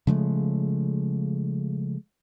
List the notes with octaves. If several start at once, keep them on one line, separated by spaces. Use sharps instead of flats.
C#3 F3 G#3 A3